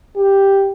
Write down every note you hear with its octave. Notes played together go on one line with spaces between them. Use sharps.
G4